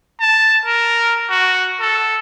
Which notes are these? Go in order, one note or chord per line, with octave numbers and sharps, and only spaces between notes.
A5
A#4
F#4
A4